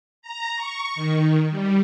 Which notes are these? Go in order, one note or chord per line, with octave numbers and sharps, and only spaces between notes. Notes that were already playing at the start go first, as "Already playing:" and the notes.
A#5
C#6
D#3
G3